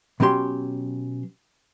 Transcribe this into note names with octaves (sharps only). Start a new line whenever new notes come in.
B2 F#3 C#4 G4 C6